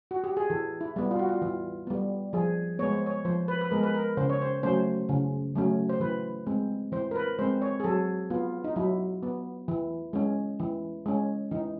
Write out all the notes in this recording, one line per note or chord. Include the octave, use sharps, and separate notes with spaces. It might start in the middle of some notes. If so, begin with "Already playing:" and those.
F#4
G4
G#4
E3 A4
E4
G3 B3
F4
F#4
F4
E3
G3 B3
F3 G#4
G#3 B3 C#5
C5
C#5
F3 C5
B4
B4
G#3 B3 A#4
B4
A#4
C#3 C5
C#5
C5
F#3 A3 C#4 C5
C#3
F#3 A3 C#4
C5
E3 B4
G#3 C4
E3 C5
A#4
B4
G#3 C4 C5
C#5
G#4
F#3 A4
B3 F4
D#4
F#3 E4
B3
E3
G#3 C#4
E3
G#3 C#4
E3 D#4